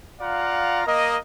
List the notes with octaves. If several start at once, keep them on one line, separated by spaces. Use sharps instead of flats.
F4 D5 F5 F#5 A#5
A#3 A#4 D#5